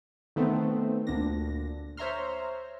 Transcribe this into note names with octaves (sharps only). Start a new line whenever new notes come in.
D#3 A3 B3 C4
D2 A#2 D4 A#6
C5 C#5 E5 A#5 C6 F6